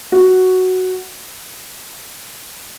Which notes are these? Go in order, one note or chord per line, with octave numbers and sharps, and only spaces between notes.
F#4